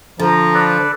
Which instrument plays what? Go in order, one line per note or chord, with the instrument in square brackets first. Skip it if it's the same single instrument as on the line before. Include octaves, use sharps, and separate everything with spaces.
[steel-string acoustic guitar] D3 [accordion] F3 [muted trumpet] A#5
[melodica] A4 B4 D5